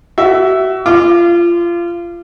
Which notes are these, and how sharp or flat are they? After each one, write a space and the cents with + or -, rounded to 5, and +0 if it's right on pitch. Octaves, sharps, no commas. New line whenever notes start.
F#4 +35 E5 +0
F4 -25 D6 +20